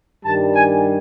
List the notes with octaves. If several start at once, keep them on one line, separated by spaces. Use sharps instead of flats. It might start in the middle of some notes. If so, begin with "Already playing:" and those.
G2 D#3 G3 A5
G#5